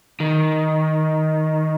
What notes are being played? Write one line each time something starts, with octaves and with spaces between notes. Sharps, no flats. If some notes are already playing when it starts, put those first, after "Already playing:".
D#3